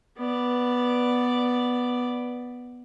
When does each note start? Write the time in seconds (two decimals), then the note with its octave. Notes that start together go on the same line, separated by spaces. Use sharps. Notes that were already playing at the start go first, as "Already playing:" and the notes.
0.18 B3 D5